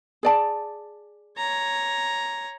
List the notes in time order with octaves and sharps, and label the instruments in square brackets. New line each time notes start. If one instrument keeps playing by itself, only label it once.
[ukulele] G#4 D5 A5
[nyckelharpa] C#5 A#5